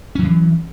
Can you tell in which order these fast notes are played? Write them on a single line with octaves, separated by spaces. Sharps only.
C#4 F#3 E3